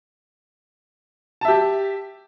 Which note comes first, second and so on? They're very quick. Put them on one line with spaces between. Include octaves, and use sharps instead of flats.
A5 E5 G4